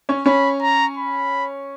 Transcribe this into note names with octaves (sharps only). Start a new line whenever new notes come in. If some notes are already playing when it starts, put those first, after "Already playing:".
C#4 C#5
C#4 C#5 B5
A#5
B5